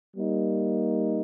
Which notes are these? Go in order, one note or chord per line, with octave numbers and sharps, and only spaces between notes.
G3 A#3 D#4